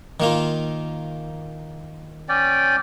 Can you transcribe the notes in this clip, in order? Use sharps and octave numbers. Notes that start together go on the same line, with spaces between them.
D#3 A#3 F4
C#4 D5 G5